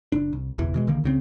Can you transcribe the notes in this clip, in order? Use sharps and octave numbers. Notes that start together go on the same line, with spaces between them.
F#1 D4
C2
F#1 B1 E2 E3
B2 E3 G#3
A#1 D3 D#3 A#3
C#2 C#3 C4